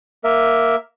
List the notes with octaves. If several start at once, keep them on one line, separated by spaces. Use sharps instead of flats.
A#3 A#4 E5